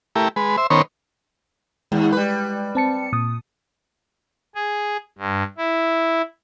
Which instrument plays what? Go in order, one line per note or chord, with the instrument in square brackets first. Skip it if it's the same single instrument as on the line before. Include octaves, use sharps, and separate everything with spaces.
[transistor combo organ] A3 E4 G4 A#4
G#3 B4
C5 E5
D#3 B3 C#4 A#4 C5 C#5
[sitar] D#2 [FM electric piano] G#3
[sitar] G3 B4
[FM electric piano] C4 A5 C#7
A#2 D#6
[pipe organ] G#4
G2
E4